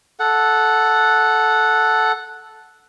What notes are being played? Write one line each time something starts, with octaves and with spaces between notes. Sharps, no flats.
A4 F#5